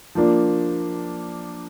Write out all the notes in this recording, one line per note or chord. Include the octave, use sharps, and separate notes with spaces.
F3 A#3 D4